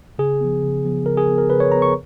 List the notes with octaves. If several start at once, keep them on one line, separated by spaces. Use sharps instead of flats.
C#3 G#4
F3 B3
C#3
F3 B3
C#3 A#4
G#4
F3 B3
A#4
C#3 B4
C#5
F3 B3 A#5
C#6